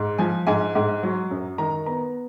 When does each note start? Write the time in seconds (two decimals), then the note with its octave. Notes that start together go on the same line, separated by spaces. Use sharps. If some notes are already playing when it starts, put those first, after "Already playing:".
Already playing: G#2
0.18 F3 G#5
0.47 G#2 G#5
0.75 G#2
1.03 F#3
1.31 F#2
1.58 D#3 A#5
1.86 B3 A#5